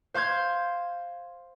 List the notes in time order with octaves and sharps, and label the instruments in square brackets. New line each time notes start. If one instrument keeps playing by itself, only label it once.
[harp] C5 F5 C6 G6 G#6